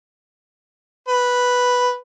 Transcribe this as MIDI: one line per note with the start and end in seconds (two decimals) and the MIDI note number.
1.08 1.94 71